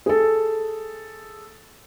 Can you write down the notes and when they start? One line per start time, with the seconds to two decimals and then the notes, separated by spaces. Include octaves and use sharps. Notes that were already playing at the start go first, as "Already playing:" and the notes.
0.06 G#4 A4